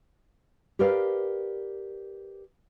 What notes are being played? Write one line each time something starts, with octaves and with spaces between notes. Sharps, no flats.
G4 A#4 B4 D5 F5